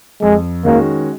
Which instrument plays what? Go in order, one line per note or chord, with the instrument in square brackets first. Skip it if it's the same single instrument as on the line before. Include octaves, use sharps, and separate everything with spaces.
[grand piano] F2 [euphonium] G#3
[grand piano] D#3 G#3 C#4 F#4 [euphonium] A#3